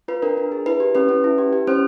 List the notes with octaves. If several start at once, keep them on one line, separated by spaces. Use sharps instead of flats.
F4 B4
D4 A#4
D4
G#4
E4 B4
G4
C#4 B4
C#4
E4
G4
G4
C#4 C5